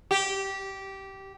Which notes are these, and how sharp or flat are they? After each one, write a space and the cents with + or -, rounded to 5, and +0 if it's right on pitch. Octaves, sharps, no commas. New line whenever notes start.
G4 -15